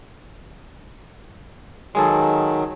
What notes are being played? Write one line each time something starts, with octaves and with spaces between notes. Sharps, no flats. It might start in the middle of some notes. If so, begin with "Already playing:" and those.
D#3 F#3 G#3 G#4 A4